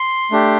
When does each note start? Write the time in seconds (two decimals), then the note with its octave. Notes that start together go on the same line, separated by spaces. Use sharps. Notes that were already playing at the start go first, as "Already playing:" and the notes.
Already playing: C6
0.31 A3 D4 G4